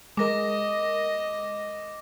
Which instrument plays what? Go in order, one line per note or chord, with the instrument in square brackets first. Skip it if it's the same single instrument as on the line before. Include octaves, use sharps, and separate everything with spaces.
[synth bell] G#3 A#4 [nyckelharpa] D#5 [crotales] D6 A#6